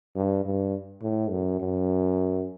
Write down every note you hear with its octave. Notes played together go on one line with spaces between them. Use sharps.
G2
G2
A2
F#2
F#2